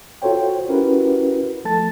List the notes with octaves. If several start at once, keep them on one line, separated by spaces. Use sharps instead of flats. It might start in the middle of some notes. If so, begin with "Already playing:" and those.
F4 F#4 A4 C5 C#5 G5
C#4 E4 F#4 G4 A#4 B4
F3 A3 A4 A5 A6